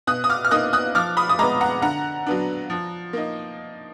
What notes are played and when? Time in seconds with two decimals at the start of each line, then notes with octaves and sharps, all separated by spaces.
0.07 B2 D#6 F#6
0.24 D#6
0.30 D6 F6
0.45 F6
0.51 A#3 D#4 D#6 F#6
0.73 D#6 F#6
0.95 F3 D6 F6
1.17 B5 D#6
1.29 D#6
1.39 G#3 B3 A#5 D6
1.61 F#5 A#5
1.82 D3 F#5 A#5
2.26 F#3 B3 D4
2.70 F3
3.13 A#3 D#4